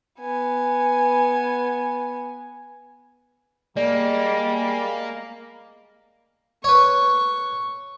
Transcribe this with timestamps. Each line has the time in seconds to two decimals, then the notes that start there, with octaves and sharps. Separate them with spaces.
0.20 B3 G#5
3.77 G3 G#3 A#3 D5
6.64 B4 C#5 C#6